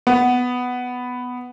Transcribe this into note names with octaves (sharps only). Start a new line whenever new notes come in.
B3